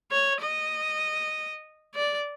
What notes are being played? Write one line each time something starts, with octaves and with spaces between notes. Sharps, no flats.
C#5
D#5
D5